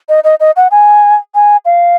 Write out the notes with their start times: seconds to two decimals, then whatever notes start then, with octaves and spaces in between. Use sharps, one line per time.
0.09 D#5
0.24 D#5
0.40 D#5
0.56 F#5
0.71 G#5
1.35 G#5
1.65 F5